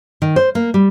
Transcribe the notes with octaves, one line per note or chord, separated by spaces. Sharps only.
D#3
C5
A#3
G3